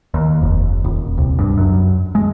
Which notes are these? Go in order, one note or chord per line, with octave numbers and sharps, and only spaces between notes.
D#2
F1
D#1
C2
G2
F#2
G#3